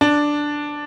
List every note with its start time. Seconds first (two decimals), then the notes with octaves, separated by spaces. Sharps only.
0.01 D4